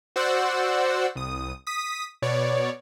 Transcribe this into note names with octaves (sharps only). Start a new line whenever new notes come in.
F#4 C5 D5 F#5 E6
C2 D#6
D#6 B6
B2 C#5 D5